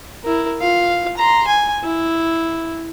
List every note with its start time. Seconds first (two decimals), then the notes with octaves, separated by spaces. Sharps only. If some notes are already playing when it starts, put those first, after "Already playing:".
0.24 E4 A#4
0.61 F4 F5
1.17 A#5 C6
1.47 G#5
1.84 E4